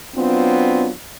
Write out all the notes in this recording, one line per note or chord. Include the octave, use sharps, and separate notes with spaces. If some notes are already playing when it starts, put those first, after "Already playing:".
F#3 B3 C4 D4 F4